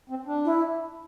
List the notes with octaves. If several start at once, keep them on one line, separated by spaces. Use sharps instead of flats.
C4
D4
E4